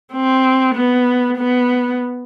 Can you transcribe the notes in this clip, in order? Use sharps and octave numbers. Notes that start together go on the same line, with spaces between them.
C4
B3
B3